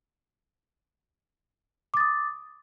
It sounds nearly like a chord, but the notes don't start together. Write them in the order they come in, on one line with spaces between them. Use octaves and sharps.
D6 A6 D#6